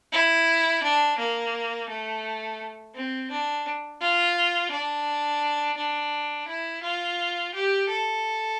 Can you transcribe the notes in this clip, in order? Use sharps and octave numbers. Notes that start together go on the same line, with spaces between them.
E4
D4
A#3
A3
C4
D4
F4
D4
D4
E4
F4
G4
A4